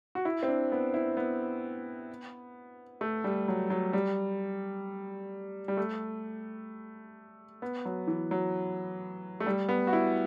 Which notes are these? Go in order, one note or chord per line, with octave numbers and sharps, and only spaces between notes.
F#4
E4
C4
D4
B3
E4
B3
A3
G3
F#3
F#3
G3
G3
A3
B3
F#3
E3
F#3
A3
G3
B3
F#4
E4